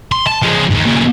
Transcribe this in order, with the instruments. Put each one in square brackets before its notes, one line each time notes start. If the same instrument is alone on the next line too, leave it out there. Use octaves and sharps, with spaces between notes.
[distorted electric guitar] C6
A5
F3 G#3
D#2 G#2
A#2 C#3